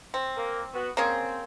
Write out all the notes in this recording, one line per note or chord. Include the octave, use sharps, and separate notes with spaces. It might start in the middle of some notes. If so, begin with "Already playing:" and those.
C4
A#3
B3 F#4
A#3 C4 C#4 G#4